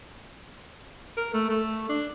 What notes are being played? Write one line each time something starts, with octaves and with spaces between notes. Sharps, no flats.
A#4
A3
A3
D4